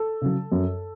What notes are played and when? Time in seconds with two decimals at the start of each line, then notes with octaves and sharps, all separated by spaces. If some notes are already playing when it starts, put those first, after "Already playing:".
Already playing: A4
0.22 C#3 F#3
0.52 F#2